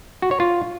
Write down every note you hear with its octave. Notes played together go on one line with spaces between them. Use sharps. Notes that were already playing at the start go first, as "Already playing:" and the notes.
F#4
C#5
F4